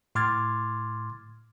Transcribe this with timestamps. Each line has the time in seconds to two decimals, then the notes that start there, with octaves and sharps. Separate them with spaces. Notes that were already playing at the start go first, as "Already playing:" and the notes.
0.15 A2 C6 D6 F6 G#6 A6